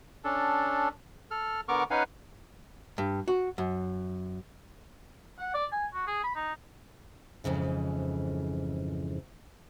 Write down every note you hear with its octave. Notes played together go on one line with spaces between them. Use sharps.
C#4 D4 A4
A4 F6
D3 B3 A#4 C#6 D6 F6
C#4 D#4 B4 F5 F#5 G#5
G2
F#4
F#2
F#5
D5
G#5
F#4
G#4
B5
D#4
F2 G#2 C#3 E3